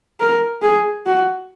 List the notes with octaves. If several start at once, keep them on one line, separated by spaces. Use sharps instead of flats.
A#4
G#4
F#4